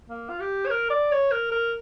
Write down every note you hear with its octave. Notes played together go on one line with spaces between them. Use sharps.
A#3
F4
G4
C#5
A#4
D5
C#5
A#4
A#4